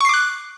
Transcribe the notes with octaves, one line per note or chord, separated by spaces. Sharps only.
C#6 D6 F#6 C7